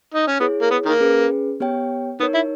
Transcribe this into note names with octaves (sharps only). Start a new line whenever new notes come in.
D#4
C#4
B3 E4 G#4 C#5
A#3
B3
D#3 A#3
C#4 G#4 B4
B3 G4 C#5 G5
B3 D#4 A#4 C#5
E4